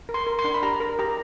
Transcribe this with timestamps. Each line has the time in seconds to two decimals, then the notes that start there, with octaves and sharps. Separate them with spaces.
0.09 A#4
0.14 C6
0.27 A#4
0.39 C6
0.44 D4
0.54 B5
0.63 G4 A#5
0.80 A#4
0.99 G4 A#5